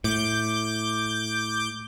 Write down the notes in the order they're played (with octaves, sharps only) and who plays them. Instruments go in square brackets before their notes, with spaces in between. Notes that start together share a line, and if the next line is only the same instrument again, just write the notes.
[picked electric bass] A2 [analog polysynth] D6 G6